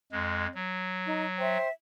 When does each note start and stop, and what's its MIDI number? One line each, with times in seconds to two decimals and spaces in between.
0.12 0.47 41
0.12 0.47 56
0.55 1.57 54
1.05 1.25 63
1.38 1.68 72
1.38 1.68 76
1.38 1.68 79